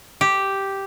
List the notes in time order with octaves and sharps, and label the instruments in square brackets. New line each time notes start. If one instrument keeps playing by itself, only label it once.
[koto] G4